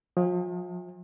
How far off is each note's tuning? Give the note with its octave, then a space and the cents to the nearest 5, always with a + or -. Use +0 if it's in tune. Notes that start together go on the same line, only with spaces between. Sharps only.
F3 +40 E5 -25 G#5 -45